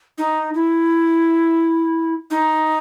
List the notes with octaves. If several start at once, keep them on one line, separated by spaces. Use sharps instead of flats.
D#4
E4
D#4